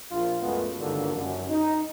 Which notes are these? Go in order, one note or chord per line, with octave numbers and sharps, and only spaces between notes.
A#1 F4
C#2 F#2 G#3 A3 B3
C#2 G2 D3 D#3 A#3 F#4
F#2
D#4